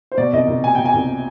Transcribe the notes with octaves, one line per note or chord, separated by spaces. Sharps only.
C5
B2 D5
C2 D#5
C2
B2 G#5
B2 G5
G#5
C2